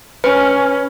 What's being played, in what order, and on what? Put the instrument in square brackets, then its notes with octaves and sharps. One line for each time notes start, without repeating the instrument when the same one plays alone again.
[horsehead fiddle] C#4 [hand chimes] B4